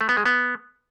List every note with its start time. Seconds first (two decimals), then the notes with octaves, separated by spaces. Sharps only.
0.01 A3
0.09 B3
0.17 G#3
0.26 B3